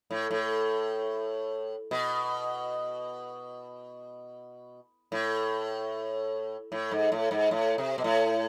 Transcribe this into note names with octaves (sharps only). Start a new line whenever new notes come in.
A2
A2
B2
A2
A2
G#2
A2
G#2
A2
C3
B2
A2